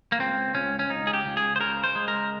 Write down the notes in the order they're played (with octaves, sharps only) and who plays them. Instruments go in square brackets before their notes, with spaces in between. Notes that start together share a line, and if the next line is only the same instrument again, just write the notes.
[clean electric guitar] A#3
C#2 C4
C#2 C#4
C#4
C#2 D#4
G#4
G4
C#2
G#4
C5
C#3 A#4
C5
G#3
A#4